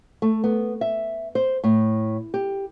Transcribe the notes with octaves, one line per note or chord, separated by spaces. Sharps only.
A3
B3
E5
C5
A2
G4